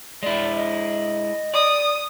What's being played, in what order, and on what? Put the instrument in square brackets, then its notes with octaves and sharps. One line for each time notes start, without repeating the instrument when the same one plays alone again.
[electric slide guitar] G#3 E4 [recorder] D5
[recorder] D#5
[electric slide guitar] D5 [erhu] D#6